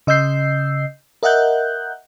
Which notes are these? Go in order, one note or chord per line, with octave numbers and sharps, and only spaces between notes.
C#3 D#5 E6 G6 C7
A#4 D#5 E5 F#5 F#6 G6